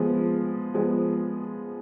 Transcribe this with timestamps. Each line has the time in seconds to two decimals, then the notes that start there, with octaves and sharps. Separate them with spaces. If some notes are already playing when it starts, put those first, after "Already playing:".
Already playing: F3 G#3 B3
0.74 F3 G#3 B3